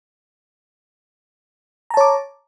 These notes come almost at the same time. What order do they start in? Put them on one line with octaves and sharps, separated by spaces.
A#5 A5 C#5 D6